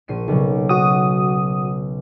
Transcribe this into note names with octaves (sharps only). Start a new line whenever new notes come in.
A#1 C7 D#7
B1 C#3 F#3
F#4 D#6